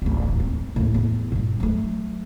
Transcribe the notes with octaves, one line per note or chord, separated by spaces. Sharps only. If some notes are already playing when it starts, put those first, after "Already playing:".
D1 A1
D#2 C4
D#2 A2
E2
G2 A#2
F#3 A3